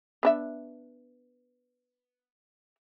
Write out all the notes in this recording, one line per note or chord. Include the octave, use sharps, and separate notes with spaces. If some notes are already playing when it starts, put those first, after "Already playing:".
B3 D4 E5